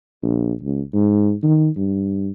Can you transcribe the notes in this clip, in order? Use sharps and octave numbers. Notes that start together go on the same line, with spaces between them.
A#1
C#2
G#2
D#3
G2